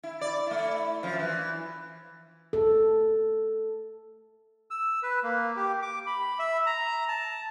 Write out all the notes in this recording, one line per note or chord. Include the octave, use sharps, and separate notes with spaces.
E4
D5
A3 E4
F#2 F3
E3
A4
E6
B4
A#3
G4
D6
B5
E5
A#5
A5